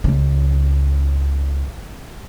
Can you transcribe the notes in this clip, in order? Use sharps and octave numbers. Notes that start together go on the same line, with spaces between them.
C#2 C#3